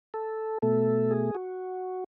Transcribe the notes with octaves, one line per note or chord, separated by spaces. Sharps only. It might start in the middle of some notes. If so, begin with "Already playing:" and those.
A4
B2 A3 A4
G#4
F#4